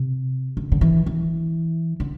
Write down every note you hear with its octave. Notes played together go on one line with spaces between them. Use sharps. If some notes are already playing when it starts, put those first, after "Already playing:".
Already playing: C3
D3
D3
E3
E3
D3